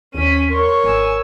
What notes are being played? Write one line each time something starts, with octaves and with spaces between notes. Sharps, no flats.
D#2 C#4 B6 D#7
A#4 C#5 C6 C#6
G#1 G#5 E6